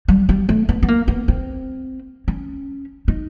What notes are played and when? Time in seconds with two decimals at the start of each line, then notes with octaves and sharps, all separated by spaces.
0.08 G3
0.29 G3
0.49 A3
0.69 B3
0.83 B3
0.88 A#3
1.08 B3
1.28 C4
2.28 C#4
3.08 D#4